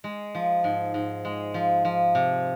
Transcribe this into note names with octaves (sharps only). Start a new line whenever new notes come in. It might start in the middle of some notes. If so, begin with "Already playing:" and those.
G#3
F3
G#2
G#2
G#3
F3
F3
C3